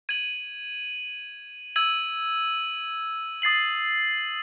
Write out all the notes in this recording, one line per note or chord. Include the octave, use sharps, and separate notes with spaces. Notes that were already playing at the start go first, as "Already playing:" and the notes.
G#6 D#7 F#7
E6 G#6 D#7 F#7
D#6 A6 C7 F#7